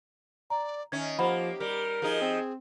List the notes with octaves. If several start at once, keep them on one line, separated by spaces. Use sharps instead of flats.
D5 A#5
D#3 C#4 E5 G#6
F3 A#3 G4 C5 F#5 B5
G3 A#4
F3 D#4 G#4
C4